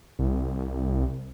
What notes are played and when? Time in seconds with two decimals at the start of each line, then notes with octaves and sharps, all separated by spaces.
0.19 C2